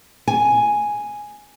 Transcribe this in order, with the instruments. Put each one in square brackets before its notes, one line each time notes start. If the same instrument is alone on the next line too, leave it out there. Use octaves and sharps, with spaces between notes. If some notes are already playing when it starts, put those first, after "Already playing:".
[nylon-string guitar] G#5